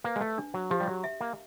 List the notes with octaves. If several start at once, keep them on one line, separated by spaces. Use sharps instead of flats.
A#3 B4
G#3
A3
D4
F#3
F3 G4
G3
F#3
E5
A#3